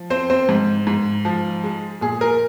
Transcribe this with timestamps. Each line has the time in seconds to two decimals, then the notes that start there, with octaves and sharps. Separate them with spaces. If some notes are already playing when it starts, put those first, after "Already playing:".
Already playing: F3
0.10 C4 C5
0.30 C4 C5
0.49 G#2
0.87 G#2
1.25 F3
1.63 G#3
2.01 A#2 G#4
2.21 A#4